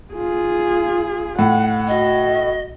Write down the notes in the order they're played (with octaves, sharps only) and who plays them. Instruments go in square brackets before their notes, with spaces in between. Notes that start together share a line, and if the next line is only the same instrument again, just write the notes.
[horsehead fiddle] F4 G#4
[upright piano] A2 [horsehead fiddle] F#5
[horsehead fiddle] F#4 [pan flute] D#5